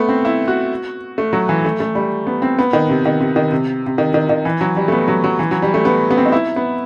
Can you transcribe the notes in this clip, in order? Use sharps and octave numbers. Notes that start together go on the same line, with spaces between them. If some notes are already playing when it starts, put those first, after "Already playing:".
Already playing: A3 B3
C4
E4
F#4
A3
F#3
E3
A3
A3
G3
B3
C4
B3
D#3
C3
D#3
C3
D#3
C3
C3
D#3
D#3
D#3
E3
F#3
G3
A3
B3
F#3
F#3
E3
F#3
G3
A3
B3
B3
C4
D#4
E4
B3